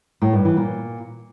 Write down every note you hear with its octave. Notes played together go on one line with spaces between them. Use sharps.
A2
G2
E3
A#2